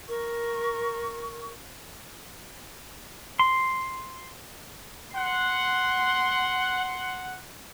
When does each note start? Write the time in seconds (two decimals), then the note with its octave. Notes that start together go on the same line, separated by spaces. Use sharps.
0.08 A#4 C#6
3.39 C6
5.15 F#5 C6